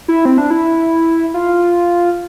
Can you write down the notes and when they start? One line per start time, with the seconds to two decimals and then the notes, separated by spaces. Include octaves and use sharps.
0.08 E4
0.25 C4
0.38 D4
0.50 E4
1.34 F4